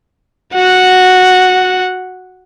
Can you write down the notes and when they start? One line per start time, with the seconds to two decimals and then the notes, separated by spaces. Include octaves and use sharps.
0.54 F#4 F#5